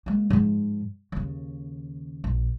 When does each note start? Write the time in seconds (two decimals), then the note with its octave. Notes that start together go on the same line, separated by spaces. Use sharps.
0.06 G#3 A#3
0.30 G#2 F3
1.12 D#2 C#3
2.24 A#1